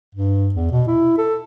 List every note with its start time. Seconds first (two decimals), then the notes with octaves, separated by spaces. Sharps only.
0.15 G2
0.55 E2
0.72 B2
0.88 E4
1.18 A4